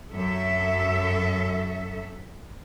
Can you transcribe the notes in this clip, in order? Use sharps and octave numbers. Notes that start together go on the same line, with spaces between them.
F#2 A4 E5